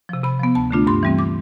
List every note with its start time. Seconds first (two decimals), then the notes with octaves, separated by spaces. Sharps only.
0.09 C3 F3
0.24 C3 B5
0.40 F3 B3
0.55 D2 A5
0.71 D3 A3 D4 F4
0.87 G2 C6
1.03 E3 G3 C4
1.19 D6